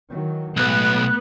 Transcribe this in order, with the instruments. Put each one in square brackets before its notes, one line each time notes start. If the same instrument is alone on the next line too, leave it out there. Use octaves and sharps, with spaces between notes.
[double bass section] D#3 E3 F#3
[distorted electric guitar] B1 [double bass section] A2 G#3 A3 [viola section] B3 [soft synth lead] F#6